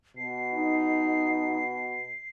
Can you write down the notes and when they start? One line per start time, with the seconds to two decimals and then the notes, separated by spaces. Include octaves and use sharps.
0.17 B2 C7
0.54 D#4